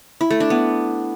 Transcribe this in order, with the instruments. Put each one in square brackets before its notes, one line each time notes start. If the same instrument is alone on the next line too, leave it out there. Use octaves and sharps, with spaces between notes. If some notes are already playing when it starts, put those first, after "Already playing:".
[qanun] E4
A3
D4
B3